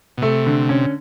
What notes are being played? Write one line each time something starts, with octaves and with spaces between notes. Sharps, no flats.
B2
C3 A3
D3
C#4